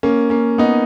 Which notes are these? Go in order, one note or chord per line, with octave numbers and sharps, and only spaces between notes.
A#3 C#4
A#3 C#4
B3 D#4